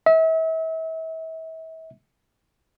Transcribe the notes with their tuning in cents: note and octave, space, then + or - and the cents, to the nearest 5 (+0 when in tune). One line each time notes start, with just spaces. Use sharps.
E5 -35